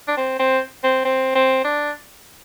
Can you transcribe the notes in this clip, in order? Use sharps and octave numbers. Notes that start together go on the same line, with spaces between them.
D4
C4
C4
C4
C4
C4
D4